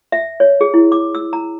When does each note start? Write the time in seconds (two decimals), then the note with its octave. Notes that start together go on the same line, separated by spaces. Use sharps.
0.12 E5
0.40 C#5
0.61 G#4
0.74 E4
0.92 D6
1.15 E6
1.33 A#5